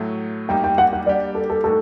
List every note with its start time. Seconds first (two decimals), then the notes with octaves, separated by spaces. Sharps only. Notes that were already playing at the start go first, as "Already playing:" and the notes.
Already playing: A2 F#3 A3
0.49 G3 A#3 D#4 G4 G5
0.64 G5
0.78 F#5
0.93 F#5
1.06 G3 A#3 D4 G4 D5
1.35 A4
1.50 A4
1.64 A2 A3 D#4 F#4 A4